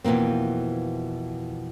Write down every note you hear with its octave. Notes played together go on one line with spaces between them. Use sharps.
F2 B2 E3 A#3 C4